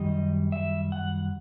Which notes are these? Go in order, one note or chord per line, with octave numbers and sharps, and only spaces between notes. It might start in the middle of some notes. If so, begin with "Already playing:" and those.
Already playing: F#2 D#3 G3 D#5
E5
F#5